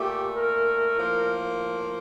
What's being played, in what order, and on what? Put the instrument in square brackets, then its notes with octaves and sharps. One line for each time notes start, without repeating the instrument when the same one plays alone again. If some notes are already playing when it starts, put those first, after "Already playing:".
Already playing: [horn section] A#2 A3 G4
A#4
A2 F3 A#3